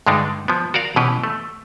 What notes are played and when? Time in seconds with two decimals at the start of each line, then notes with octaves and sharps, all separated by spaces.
0.07 G2 D3 G#3 D4 D#4
0.48 F3 B3
0.74 F#4 A#4 D5 F5
0.96 B2 E3 C#4 G4 B4
1.24 A3